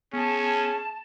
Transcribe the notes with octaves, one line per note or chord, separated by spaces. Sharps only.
B3 C#4 G#4 A5